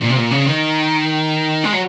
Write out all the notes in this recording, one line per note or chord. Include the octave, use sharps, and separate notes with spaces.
A#2
C3
A#2
C#3
D#3
G#3
F#3